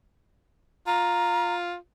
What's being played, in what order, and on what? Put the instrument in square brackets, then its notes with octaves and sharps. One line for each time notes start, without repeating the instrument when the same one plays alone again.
[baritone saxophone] F4 [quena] A#5